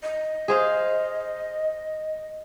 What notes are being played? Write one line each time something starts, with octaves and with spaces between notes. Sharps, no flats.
D#5
G#4 C5 F5